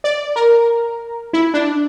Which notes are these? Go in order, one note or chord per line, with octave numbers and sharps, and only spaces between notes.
D5
A#4
E4
D4